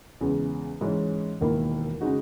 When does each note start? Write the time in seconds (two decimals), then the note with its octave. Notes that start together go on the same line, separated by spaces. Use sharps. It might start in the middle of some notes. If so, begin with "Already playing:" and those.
0.21 E2 C#3 G#3
0.81 G#2 E3 G#3 C#4
1.41 E1 D#2 D#3 A#3 E4
2.01 C#3 G#3 D#4 F#4